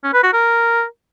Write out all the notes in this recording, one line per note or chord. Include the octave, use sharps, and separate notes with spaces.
C#4
B4
F#4
A#4